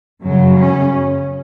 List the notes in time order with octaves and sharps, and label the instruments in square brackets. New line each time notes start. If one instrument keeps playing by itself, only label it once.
[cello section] F#2 C#3 F#3
C#4